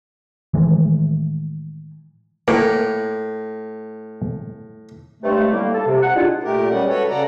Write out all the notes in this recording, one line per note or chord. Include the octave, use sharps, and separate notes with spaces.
A2 D#3 E3 G#3
A2 A#3 A#4 F#5
G2 C3 G#3 A3
A2 D3 G3 A#3
A4
C3
F#5
G3 G#3 D4 E4 F4
A#2 A3 G4 A#4
G3 G#3 C#4 F#5
F#4 A4 B4 C#5
C#3 A4 D5 F#5 A#5